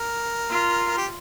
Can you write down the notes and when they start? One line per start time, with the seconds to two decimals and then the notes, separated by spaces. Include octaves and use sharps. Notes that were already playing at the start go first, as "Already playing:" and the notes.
Already playing: A#4
0.50 F4
0.98 G4